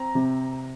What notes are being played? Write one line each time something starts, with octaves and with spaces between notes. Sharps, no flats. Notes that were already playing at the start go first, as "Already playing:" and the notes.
Already playing: C4 A#5
C3